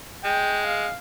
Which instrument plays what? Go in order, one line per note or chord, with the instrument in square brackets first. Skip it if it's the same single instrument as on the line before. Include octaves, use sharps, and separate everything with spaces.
[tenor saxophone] G#3 [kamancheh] G5
[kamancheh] F5